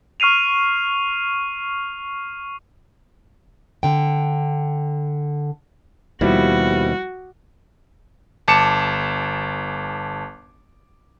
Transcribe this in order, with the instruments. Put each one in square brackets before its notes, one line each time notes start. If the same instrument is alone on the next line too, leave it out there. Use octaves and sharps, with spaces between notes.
[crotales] C#6 F6 C7 D#7 F7
[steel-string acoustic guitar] D3 G5
[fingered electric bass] D#2 B2 [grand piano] F3 G3 E4 [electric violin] F#4
[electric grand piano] G1 A5 D6 C#7 E7